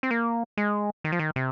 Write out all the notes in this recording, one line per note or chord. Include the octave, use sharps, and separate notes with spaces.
C4
A#3
G#3
D#3
F3
D#3
C3